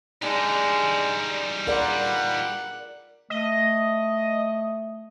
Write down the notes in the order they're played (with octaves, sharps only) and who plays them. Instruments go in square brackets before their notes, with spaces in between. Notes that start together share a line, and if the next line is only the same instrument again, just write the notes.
[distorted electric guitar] G3 D#4 [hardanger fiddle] G#3 [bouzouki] D4
[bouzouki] F4 G#4 B4 [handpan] A#4 D5 [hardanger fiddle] F#5
[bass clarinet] A3 [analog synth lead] D#5